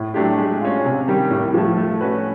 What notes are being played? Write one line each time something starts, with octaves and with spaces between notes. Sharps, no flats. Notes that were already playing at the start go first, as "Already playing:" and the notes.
Already playing: A2
F#3 A3 D4 G4
G#3
C#4 F4
C3
D#3 G3
A2
F3 A3
A3
C#4 F#4 B4